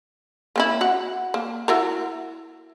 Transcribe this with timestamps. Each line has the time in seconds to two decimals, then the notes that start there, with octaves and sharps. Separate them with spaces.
0.56 A#3 C#4 E4
0.81 F#4 F#5
1.34 A#3
1.68 E4 F#4 A#4